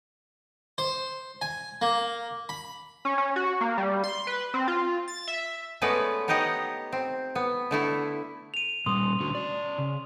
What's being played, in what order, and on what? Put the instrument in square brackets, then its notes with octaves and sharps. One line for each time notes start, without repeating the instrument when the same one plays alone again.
[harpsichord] C5
G#5
A#3
B5
[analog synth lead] C#4
C#4
F#4
A#3
G3
C6
B4
C4
F4
A6
E5
[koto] G#3 A3 B3 C#4 B4 D5
B3 D#4 G4 C#5 D#5 F#5
C4
B3
D3 A3 E4
[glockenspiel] D#7 F7
[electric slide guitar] A#2 G3 [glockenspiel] C6 D#6
[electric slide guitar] A2 D3 F#4
C#4 D5
C#3